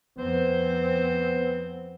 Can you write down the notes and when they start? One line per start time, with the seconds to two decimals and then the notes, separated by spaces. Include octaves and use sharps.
0.18 F2 B3 C4 C5